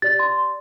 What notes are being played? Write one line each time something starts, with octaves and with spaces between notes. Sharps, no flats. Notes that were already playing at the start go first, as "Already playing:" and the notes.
G4 D5 A6
C6